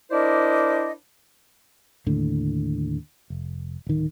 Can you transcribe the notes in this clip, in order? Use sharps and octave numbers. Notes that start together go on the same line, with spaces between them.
D4 E4 A#4 C5 D5 D#5
D#2 A2 D3
F1
D1 D#3